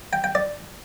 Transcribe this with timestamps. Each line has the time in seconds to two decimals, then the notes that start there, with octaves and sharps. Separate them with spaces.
0.13 G5
0.24 G5
0.35 D5